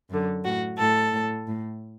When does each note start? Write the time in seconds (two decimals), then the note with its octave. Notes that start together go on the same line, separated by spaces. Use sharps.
0.10 F#2 D3
0.44 A2 F#4
0.78 A2 A4
1.12 A2
1.47 A2